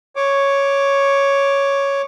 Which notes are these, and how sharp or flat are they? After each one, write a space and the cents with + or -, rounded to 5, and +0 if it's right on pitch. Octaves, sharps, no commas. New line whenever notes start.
C#5 +0 D6 +0